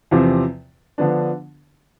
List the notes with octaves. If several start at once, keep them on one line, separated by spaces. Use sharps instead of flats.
E2 C3 F3 C4
D3 F3 B3 D4